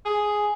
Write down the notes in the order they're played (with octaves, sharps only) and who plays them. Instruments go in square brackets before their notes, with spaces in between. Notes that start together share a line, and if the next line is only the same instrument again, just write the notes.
[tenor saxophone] G#4